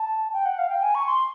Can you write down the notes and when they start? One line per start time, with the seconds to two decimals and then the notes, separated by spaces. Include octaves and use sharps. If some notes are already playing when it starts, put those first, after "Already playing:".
Already playing: A5
0.33 G5
0.45 F#5
0.58 F5
0.69 G5
0.82 G#5
0.95 C#6
1.07 C6